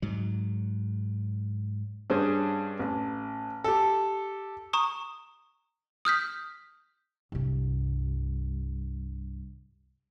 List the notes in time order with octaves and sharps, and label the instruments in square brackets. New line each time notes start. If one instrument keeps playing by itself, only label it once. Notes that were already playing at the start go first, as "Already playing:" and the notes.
[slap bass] G#2 F#3
[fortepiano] G2 C#4 G#4 C5
A1
G4 A4
[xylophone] A#5 C#6 D#6
D#6 F6 G6 B6
[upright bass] C2 G2